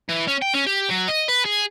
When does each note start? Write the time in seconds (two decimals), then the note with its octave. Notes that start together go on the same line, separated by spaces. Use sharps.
0.09 E3
0.28 C#4
0.42 G5
0.54 C#4
0.66 G4
0.90 F#3
1.09 D#5
1.29 B4
1.46 G#4